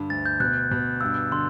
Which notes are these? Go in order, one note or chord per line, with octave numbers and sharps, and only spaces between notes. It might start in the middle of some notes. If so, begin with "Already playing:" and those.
Already playing: G2 D3
D2 A6
G6
B2 F#6
B2
G2 E6
D3 C6